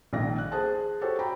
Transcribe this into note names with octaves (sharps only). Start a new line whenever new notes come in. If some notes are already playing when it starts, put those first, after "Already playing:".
A#1 A#2 D#3 F5 G5 A#6
F#6
G#4 C5 A5
F#4 G4 A4 C5 C#5
G5 A#5 B5